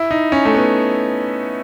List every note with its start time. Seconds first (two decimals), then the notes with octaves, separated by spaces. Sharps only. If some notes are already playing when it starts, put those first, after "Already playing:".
Already playing: E4
0.11 D#4
0.32 C#4
0.45 A3
0.54 B3